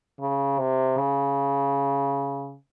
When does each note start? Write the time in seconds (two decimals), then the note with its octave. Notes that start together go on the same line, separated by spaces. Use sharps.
0.20 C#3
0.59 C3
0.98 C#3